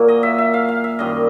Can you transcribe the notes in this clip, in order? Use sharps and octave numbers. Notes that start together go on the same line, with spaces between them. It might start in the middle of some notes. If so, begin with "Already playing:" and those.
Already playing: A#2 F#3 A#3
D#5
E5
E5
F5
F5
E5
F#2 D#3 G3 D#5